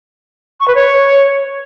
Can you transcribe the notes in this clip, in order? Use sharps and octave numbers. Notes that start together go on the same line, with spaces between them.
C#6
B4
C#5